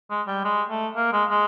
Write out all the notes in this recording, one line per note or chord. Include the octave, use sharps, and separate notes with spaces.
G#3
G3
G#3
A3
A#3
G#3
G#3